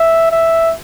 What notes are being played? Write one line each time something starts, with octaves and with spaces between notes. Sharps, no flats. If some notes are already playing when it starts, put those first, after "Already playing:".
Already playing: E5
E5